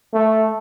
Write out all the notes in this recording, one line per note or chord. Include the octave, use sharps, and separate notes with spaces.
A3